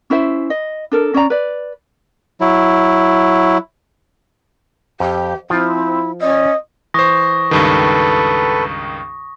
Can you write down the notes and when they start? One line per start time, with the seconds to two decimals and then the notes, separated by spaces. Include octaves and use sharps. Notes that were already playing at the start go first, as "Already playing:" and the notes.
0.10 C#4 E4 C5 E5
0.50 D#5
0.92 D4 A4 A#4
1.14 C#4 D5 A#5
1.30 B4 D5
2.41 F#3 E4
5.00 F2 G4
5.50 F3 C4 E4 F4 G5
6.21 C#4 D5 D#5
6.94 E3 C5 C#6 D#6 A#6
7.51 C#2 G2 D#3 A4 B4